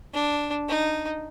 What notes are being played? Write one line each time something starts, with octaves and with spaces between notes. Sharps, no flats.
D4
D#4